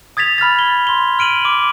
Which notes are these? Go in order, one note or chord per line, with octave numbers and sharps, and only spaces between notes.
D#6 G#6 A6 B6 F7
B5 F6 G#6 A6
G7
C6 G7
F6 D7 D#7 F#7
D6